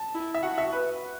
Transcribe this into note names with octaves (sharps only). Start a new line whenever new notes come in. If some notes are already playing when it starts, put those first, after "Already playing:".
Already playing: A5
E4
E5
F#4 F#5
E5
B4